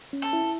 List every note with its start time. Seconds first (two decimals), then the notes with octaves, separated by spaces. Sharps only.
0.13 C#4
0.22 A4
0.33 E4